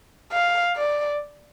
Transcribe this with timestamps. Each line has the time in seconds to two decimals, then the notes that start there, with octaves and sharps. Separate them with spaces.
0.32 F5
0.76 D5